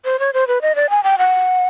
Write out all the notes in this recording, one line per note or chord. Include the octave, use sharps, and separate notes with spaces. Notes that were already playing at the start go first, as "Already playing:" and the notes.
C5
C#5
C5
B4
D#5
D5
G#5
G5
F#5